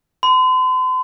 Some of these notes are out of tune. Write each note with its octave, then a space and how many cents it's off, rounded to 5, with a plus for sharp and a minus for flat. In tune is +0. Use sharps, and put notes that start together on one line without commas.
C6 -45